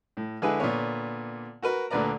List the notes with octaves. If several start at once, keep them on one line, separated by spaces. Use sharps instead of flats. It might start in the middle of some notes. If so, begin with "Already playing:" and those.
A2
D3 G#3 E4 G#4 B4
A#2 D3 B3 C#5
F#4 A#4 B4
D2 A#2 D3 B4 D5 A#5